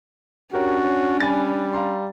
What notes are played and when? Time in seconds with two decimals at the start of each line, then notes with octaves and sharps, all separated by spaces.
0.53 C#4 D4 F#4 G4 A#4 C#5
0.84 C#5
1.20 G3 G#5 B5 A6
1.73 F5 A#5 C6